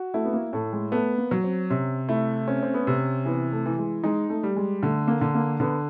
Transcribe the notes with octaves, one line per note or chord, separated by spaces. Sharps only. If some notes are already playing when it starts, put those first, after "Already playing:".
Already playing: F#4
A3 E4
B3
A#3
A2 A3
G#3
A3 B3
A#3
F#3
C4
C3 C#4
A3 E4
C4 C#4
C4
B3
C3
E3 B3
A3
E3
G#3
G#3 D#4
A3
G3
G#3
D3 A3
A#3
D3
A#3
D3 B3